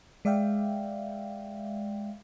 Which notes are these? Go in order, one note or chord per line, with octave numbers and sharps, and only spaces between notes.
G#3 D5 E5 F5 G5